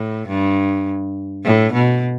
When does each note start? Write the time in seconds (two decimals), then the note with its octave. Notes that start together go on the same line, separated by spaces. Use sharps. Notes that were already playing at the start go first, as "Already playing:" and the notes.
Already playing: A2
0.28 G2
1.44 A2
1.73 B2